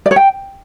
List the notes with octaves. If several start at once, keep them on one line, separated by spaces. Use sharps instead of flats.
D5
C#5
G5